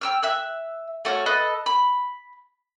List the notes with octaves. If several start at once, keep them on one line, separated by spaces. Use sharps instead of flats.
G5 E6 F6
E5 E6 F#6
A3 F#4 C#5 F6
A4 B4 D#5
B5